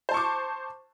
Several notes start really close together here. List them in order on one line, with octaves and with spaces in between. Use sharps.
C5 A5 C#6 D6